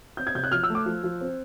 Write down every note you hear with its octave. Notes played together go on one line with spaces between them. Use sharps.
C4 G6
G#6
C3 G6
F#6
F3 F6
E6
A3
D6
F3
F3
C4